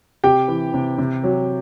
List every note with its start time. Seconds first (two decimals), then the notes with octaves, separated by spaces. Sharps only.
0.24 C3 G4 G5
0.48 E3
0.74 C3
0.98 C3
1.23 F#3